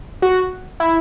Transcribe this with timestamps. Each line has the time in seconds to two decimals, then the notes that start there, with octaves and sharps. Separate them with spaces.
0.22 F#4
0.80 E4